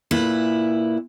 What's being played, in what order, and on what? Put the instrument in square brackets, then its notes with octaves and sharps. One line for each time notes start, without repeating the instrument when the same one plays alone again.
[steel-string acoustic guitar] A#2 E4 B4